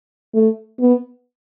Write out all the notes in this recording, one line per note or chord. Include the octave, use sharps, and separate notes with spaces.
A3
B3